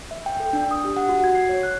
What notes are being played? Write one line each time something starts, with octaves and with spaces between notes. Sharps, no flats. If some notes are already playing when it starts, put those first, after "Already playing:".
E5
G5
A4
D4
D#6
G4
F#5
F#4
G#6
C7
C#5
F#6